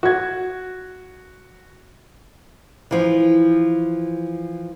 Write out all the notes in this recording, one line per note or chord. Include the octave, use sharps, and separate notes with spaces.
F#4 G#6
E3 F3